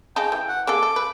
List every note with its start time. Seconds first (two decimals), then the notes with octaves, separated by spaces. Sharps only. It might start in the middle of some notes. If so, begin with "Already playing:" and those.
0.16 C#3 D#4 G5 A5
0.32 E3
0.48 F#5
0.67 A#3 G#4 A4 D6
0.83 A4
0.96 B4